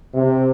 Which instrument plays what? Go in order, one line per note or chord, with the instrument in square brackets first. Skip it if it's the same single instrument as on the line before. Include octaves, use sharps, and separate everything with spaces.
[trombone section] C3